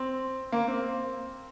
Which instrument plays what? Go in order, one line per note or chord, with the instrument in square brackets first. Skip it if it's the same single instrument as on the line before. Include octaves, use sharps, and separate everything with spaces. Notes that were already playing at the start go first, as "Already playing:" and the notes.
Already playing: [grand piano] C4
A#3
C4